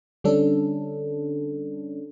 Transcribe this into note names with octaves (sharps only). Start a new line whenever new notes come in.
D3 G3 C#4 D4 A4